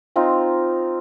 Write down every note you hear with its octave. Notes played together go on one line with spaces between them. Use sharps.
C4 D#4 F4